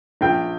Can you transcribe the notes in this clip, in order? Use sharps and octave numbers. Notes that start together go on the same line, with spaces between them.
A#1 G5